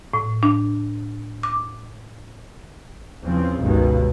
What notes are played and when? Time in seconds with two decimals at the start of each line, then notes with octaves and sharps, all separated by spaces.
0.14 A2
0.43 D4
1.43 D6
3.24 E2 C#3 F3 C4
3.60 G1 C#2 G2 B2 D#3